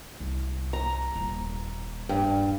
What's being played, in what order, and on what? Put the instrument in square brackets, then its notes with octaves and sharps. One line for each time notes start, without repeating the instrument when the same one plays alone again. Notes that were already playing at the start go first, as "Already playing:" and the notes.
[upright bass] C2
[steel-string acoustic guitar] A#5
[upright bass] D#1 A#3
[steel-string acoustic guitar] G2